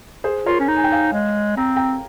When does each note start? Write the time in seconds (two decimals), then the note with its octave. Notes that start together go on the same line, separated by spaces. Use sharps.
0.24 G#4 C5
0.46 F4 A#4 C#5
0.60 C#4
0.68 D#4 A#5
0.76 G#5
0.84 G5
0.92 F5 G#5
1.13 G#3
1.57 C4 A#5
1.76 G5 A#5